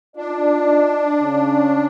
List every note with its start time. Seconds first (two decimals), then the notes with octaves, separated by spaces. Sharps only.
0.17 D4 D#4 F4 D5
1.22 C#3 C#4